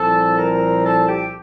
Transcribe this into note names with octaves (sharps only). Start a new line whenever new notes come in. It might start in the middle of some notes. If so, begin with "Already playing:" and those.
Already playing: C2 A#2 F3 C4 A4 A5
A#4 A#5
A4 A5
G4 G5